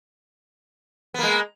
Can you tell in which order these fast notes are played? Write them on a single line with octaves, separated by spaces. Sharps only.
B3 A#3 G#3